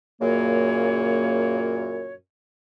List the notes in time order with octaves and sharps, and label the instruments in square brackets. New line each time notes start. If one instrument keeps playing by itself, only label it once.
[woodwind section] F#2 A#2 C#3 A#3 C#5